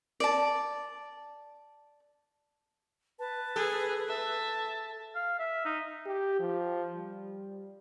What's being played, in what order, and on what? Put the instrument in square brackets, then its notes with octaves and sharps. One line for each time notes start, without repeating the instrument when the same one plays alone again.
[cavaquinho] D5 A5
[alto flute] B4 [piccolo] A5
[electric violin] G#4 [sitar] A4
[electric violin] E5 [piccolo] A5
[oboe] F5
E5
D#4
[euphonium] G4
F3
G3